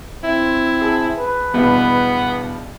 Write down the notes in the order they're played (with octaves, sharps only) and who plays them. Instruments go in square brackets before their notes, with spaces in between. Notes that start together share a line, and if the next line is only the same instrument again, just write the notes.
[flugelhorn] C4 [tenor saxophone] E4
[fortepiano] G#4 A5
[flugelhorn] B4
[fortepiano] E2 G2 B2 [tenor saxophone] B3